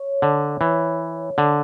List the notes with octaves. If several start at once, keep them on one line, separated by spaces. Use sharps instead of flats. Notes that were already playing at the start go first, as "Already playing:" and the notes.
Already playing: C#5
D3
E3
D3